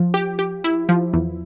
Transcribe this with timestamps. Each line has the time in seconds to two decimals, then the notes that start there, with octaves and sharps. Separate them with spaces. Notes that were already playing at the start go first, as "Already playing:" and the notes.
Already playing: F3
0.14 G4
0.39 G4
0.64 E4
0.89 F3
1.13 E2